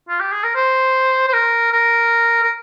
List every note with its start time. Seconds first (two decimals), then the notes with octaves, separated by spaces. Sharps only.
0.09 F4
0.20 G4
0.32 G#4
0.44 A#4
0.55 C5
1.28 C5
1.33 A#4
1.72 A#4
2.42 A#4